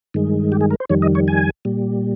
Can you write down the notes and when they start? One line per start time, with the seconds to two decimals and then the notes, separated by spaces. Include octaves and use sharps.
0.14 G2 D#3 G#3
0.52 G4
0.61 G#4
0.70 A#4
0.80 C5
0.89 F2 D#3 G3 C#5
1.02 D#5
1.15 C#5
1.28 G#5
1.65 A#2 G3